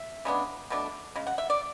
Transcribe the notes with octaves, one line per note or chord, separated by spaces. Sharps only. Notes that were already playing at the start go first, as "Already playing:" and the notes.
Already playing: E5
C#3 G#3 B3 D4
B2 A3 D4
C#3 G#3
F#5
E5
D5